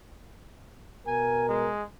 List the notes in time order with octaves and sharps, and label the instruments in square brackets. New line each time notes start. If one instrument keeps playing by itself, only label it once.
[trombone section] B2 A#4 [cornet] G#5
[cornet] G#3